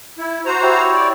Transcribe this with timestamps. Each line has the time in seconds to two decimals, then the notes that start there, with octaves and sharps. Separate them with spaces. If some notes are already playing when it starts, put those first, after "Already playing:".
0.18 E4
0.46 F#4 C5 A#5
0.62 E4 G4 C#5
0.93 D5